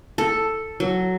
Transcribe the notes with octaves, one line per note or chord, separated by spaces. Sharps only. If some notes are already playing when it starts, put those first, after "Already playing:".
A4
F#3